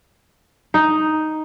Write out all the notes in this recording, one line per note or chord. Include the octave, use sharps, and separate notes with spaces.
D#4